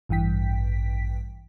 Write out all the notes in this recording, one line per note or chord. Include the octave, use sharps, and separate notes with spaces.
A1 G2 E3 G5 B6